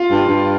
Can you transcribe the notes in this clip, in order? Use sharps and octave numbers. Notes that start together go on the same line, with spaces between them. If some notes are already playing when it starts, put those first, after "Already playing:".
Already playing: F4
G2
G2